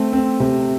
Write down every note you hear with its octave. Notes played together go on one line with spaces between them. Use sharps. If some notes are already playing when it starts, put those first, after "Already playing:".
Already playing: A3 C4
C4
C3